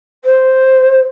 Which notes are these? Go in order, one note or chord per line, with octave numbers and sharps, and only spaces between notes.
C5